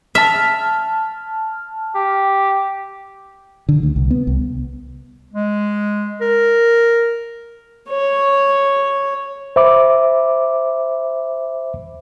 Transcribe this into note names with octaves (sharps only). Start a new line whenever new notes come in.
E5 A5 F6
G4
D3
D2
C2
B3
C2
G#3
A#4
C#5
C5 E5 B5 D6